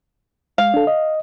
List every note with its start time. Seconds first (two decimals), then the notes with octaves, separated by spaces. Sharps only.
0.58 G#3 F5
0.74 D4 A4
0.87 D#5